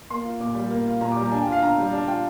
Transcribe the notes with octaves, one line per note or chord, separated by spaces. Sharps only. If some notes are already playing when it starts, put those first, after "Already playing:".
A#3 C6
F4
A#2 D6
G3
A#3
F4
A#2 A#5
G3 D6
A#5
D4 G#5
G5
F4 F5
D3 A#5
G3
D4
F4 G5